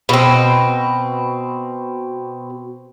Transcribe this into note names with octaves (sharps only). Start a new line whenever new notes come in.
B2 C4